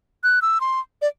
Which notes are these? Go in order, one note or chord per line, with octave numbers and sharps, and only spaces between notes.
F#6
E6
C6
D5